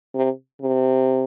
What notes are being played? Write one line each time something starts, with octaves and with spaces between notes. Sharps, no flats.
C3
C3